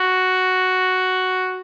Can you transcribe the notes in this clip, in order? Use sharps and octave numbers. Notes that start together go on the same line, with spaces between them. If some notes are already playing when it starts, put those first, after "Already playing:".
Already playing: F#4